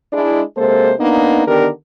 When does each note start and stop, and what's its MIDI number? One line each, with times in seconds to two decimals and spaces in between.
0.13 0.43 56
0.13 0.43 62
0.13 0.43 64
0.57 0.94 48
0.57 0.94 56
0.57 0.94 58
0.57 0.94 69
0.57 0.94 72
1.00 1.46 58
1.00 1.46 59
1.00 1.46 62
1.00 1.46 63
1.48 1.69 50
1.48 1.69 51
1.48 1.69 59
1.48 1.69 62
1.48 1.69 67
1.48 1.69 70